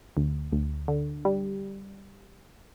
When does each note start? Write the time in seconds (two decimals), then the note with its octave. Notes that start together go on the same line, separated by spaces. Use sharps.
0.17 D2
0.52 D2
0.88 D3
1.25 G3